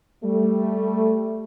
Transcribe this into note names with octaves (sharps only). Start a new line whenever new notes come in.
G3 A3